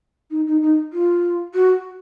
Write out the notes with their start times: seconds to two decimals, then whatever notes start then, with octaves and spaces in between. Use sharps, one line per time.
0.31 D#4
0.47 D#4
0.62 D#4
0.93 F4
1.54 F#4